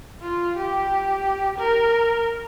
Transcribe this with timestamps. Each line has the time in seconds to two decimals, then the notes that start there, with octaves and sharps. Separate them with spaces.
0.22 F4
0.57 G4
1.58 A#4